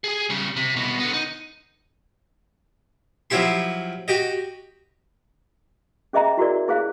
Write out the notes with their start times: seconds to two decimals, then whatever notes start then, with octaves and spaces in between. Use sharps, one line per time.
0.04 G#4 G#5
0.30 C#3 G3
0.56 C3
0.76 C2 B2
0.99 D3 B3
1.13 D#4
3.30 F3 F#3 E4 G4 C6
4.08 F#4 G4 D#5
6.13 C#4 G#4 D#5 E5 A#5
6.37 E4 F#4 G#4 A#4 D5
6.68 E4 G#4 C5 F5